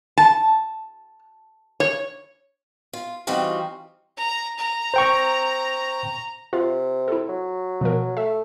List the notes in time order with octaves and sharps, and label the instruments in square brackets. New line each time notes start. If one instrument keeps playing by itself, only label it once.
[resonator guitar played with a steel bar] A5
C#5
[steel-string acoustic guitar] F4
E3 G3 C4 D#4 F4 F#4
[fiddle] A#5
A#5
[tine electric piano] C5 G5 C#6
[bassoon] C3 [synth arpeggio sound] F4
[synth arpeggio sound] E4 A4
[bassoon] F#3
[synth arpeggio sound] B2 F3 A#4
[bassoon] A3 [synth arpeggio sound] E5